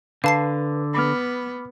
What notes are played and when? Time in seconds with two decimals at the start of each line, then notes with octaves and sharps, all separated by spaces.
0.24 D3 B4 F5 A5 C7
0.94 B3 B5 D6 F6